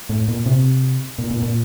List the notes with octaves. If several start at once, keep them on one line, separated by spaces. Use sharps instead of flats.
A2
A#2
C3
A#2
A#2
A#2